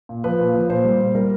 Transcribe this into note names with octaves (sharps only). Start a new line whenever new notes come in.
A#2
F3 B4
A#2
F3
A#2 C5
G3
A#2
G3 A#4